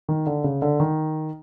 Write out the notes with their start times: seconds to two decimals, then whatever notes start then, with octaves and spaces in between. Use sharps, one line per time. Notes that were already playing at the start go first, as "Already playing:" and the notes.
0.09 D#3
0.27 D3
0.44 C#3
0.62 D3
0.80 D#3